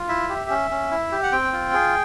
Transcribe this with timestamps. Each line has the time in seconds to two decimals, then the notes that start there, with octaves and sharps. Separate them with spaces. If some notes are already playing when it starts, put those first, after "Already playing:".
Already playing: F4
0.09 E4 E5
0.29 G4
0.50 C#4
0.71 C#4
0.91 E4
1.12 G4
1.23 F#5
1.32 C4 G5
1.53 F4
1.73 G#4